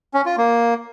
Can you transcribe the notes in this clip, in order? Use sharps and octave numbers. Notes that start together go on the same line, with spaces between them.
C#4
F4
A#3